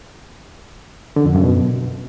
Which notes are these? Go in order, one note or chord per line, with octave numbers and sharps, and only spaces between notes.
D3
F2
F#2
B2